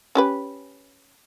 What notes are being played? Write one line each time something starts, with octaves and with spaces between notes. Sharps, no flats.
C#4 G4 B4